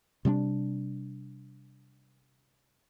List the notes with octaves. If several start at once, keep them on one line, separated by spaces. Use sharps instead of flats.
C3 G3 C4 D4